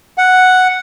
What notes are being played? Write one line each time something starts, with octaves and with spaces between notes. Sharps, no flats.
F#5